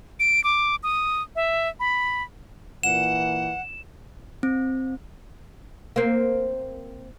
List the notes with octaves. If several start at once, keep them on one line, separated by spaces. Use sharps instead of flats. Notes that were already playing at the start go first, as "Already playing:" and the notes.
D7
D6
D#6
E5
B5
A#2 E3 F#5 E7
C4
A#3 C4